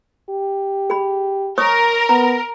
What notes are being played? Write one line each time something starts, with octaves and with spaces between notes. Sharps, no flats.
G4
G#4 B5
A#4 C#5 C#6 D#6
B3 A#5